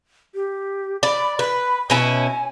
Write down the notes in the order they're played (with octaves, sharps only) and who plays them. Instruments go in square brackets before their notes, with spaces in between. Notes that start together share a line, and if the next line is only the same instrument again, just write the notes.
[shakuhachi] G4
[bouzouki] D5 [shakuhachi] B5
[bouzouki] B4 [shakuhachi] B5
[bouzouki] B2 C#4 E4 [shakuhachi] G#5